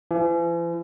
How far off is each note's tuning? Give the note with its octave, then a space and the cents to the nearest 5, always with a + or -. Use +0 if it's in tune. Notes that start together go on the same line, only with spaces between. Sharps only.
E3 +45